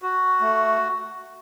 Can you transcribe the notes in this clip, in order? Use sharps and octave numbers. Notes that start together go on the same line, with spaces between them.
F#4
A3